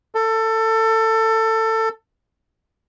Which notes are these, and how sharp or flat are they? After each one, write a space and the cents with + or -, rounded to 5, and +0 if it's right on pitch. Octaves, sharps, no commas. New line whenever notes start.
A4 +20